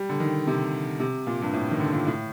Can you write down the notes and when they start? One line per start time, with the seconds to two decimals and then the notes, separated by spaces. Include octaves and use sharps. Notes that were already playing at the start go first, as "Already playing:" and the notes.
Already playing: G3
0.09 D3
0.20 D#3
0.47 C3
1.00 C3
1.27 A#2
1.42 G2
1.53 A2
1.71 D#3
1.80 D3
1.93 A#2
2.07 A2